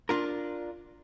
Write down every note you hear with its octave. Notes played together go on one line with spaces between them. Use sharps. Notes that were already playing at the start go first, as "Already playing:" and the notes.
D4 F4 A#4